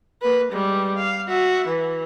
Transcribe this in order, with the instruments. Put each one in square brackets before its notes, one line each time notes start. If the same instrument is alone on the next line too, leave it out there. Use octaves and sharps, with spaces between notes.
[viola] A#3 B4
G3 G#3
F5
F#4 E5
E3